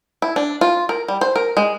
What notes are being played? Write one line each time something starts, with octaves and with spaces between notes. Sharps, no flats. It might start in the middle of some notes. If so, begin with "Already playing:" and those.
E4
D4
F4
A#4
G3
C5
A#4
G#3